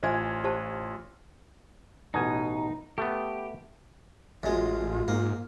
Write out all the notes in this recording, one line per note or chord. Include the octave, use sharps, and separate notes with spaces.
A1 F4 C5 D#5 G#5 G#6
G4 C5 A5
A1 B2 D#4 G#5
A3 B3 G4
A1 F#2 G#3 F4
G#2 A#3